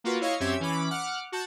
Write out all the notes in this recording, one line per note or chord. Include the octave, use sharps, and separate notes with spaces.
A#3 F4 F#4 B4
E4 C#5 D#5 F5 C#6
F#2 C4 C#4 G4 E5 G#6
E3 C#4 B5 D6
F#5 D6 F6
F#4 A5 G6